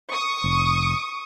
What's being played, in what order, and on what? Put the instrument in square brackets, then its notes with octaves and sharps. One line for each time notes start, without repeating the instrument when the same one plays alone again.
[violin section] C#6 D#6
[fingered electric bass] F1